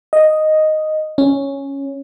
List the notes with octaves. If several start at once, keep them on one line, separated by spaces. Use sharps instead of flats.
D#5
C#4